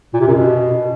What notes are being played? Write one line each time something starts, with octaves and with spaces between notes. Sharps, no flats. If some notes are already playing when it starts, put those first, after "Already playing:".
A#2
C3
F#2
B2